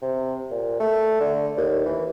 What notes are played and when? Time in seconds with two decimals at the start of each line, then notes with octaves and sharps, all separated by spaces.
0.02 C3
0.51 A#2
0.80 A3
1.20 D3
1.57 D#2
1.86 E3